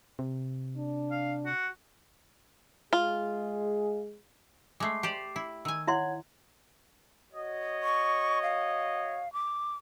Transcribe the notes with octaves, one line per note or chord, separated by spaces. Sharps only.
C3
D4
F5
F#4
G#3 F4 G#4
G#3 A3 D6 C7
G4 C5 D5
E4
D#3 G#5 E6
E4 C#5 E5 F#5 C6 G#6
F#4 C#5 D#5
C#6
F5
D6